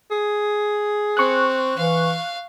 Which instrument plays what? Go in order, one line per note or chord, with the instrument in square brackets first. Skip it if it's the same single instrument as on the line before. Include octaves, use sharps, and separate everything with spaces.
[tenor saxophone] G#4
[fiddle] C4 [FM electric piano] C#6 F#6
[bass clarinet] E3 [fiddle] F5